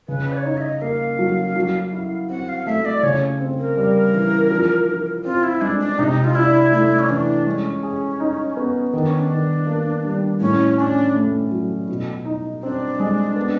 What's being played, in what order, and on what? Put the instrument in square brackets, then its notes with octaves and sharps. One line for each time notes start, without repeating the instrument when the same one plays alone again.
[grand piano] C#3 [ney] B4
[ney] D5
C#5
[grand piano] D#4
[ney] E5
D#5
[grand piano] A#3 [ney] F5
[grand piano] F#3
F#3
E4
[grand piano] C4 [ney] F#5
[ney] F5
[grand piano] A3 [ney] E5
[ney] D5
[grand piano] C#3 [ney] C#5
[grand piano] C4
[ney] A#4
[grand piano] G3
E3
F3
F3
[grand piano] C4 [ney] F4
[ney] E4
[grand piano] G#3 [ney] D4
[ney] D4
[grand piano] C3 [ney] D#4
[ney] F4
[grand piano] D4 [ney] E4
[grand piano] A3 [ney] E4
[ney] C#4
[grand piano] E3 [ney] D4
[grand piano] G#3 [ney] C#4
[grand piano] G#4
D#4
B3
[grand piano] D#3 [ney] D4
[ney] C#4
D4
[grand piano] D#3
A#3
G3
[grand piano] A2 [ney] C#4
[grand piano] C#4 [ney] D4
[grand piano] A3
F#3
B2
D#4
[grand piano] C4 [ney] D4
[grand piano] G#3
B3